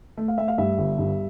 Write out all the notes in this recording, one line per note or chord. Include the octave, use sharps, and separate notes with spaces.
A3
F5
A3 E5
F5
G2 E5
G1
G2